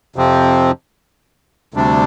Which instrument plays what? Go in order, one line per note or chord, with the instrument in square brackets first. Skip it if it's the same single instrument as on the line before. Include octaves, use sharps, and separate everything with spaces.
[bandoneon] F2 C3 F3 C4
D2 C3 G3 D4